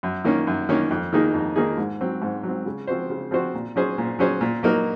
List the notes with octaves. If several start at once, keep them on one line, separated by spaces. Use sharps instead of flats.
F#2
D#3 A#3 C#4
F#2
D#3 A#3 C#4
F2
D#3 A#3 D#4 G#4
F2
D#3 A#3 D#4 G#4
G#2
F#3 C4
G#2
F#3
C4
C#3
F3 C4 F#4 C5
C#3
F3 C4 F#4 C5
A#2
F#3 C#4 G#4 C5
A#2
F#3 C#4 G#4 C5
A#2
F#3 A#3 D#4 A#4